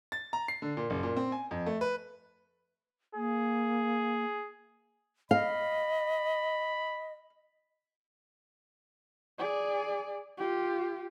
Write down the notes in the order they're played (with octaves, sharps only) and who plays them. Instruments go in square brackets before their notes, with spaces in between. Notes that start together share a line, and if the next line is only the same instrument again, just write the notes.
[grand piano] A6
A#5
C7
D3
A#2
F#1
A#2
C4
G#5
F2
A3
B4
[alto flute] A#3 [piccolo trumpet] G#4
[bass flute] D#5 [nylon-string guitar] F5 [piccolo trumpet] B5
[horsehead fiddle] G#4 D5
F4 G4